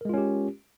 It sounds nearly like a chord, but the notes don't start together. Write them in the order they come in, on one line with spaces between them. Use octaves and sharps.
A#4 G#3 F4 C#4 G4